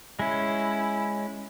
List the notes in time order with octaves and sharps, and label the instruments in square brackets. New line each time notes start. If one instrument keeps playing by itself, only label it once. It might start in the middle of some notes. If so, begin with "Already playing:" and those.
[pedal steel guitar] G#3 C#4 [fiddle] E4